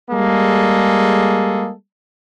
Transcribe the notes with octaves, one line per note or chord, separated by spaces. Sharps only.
G3 G#3 A#3 G#4 A4